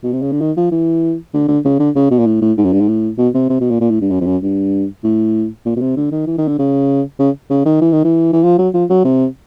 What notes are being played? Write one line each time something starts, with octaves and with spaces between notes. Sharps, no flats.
B2
C3
C#3
D3
D#3
F3
E3
D3
D3
C#3
D3
C#3
B2
A#2
A2
A2
G#2
F#2
G2
G#2
A2
B2
C3
C3
B2
A#2
A#2
A2
G2
F#2
F2
F#2
G2
A2
A#2
B2
C3
D3
D#3
E3
D#3
D3
C#3
C#3
C#3
D#3
E3
D#3
E3
E3
F3
F#3
F3
F#3
C3